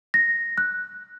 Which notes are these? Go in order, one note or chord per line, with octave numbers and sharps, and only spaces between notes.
A#6
F#6